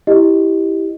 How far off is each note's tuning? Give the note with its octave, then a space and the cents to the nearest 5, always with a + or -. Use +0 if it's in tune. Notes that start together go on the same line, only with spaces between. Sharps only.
E4 -5 G4 +0 D#5 +0